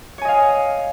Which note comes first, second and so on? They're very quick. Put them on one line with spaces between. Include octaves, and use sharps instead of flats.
C#5 G#5 D#5 F5